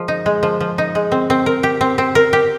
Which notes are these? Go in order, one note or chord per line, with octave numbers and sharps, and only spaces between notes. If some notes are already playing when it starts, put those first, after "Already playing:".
Already playing: F3 G#3
D#4
G#3
F3
F3
D#4
G#3
C4
C4
A#4
G4
C4
C4
A#4
G4